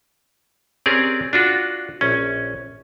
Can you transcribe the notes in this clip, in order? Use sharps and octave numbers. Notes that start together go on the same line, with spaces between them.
C4 C#4 G4 G#4 A#4 D5
D4 F4 F#4
A#1 C#4